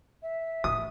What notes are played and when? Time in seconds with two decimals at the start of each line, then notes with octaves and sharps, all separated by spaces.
0.22 E5
0.64 A1 D#6